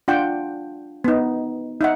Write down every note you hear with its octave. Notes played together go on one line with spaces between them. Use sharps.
D4 F4 F#5 G5
B3 D#4
D#4 E5 F#5